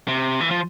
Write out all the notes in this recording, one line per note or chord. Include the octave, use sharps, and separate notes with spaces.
C3
E3
F3